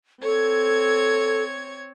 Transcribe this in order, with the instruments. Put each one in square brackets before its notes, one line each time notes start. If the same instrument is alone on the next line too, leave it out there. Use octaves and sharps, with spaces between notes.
[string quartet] C4 C#5 G#6 [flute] A4